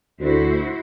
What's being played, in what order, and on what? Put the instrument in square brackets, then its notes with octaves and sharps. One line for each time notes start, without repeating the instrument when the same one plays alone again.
[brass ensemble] D2 [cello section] E4 F#4 C5